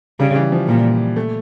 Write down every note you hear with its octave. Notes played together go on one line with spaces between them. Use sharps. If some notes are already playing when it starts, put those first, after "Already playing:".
C#3 G3
E3
F3
A#2 G3
A3